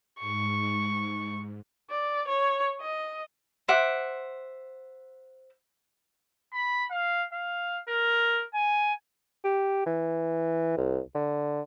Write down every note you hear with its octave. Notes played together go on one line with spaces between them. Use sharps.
G#2 C#6
D5
C#5
D#5
C5 E5 F#5 D6
B5
F5
F5
A#4
G#5
G4
E3
C2
D3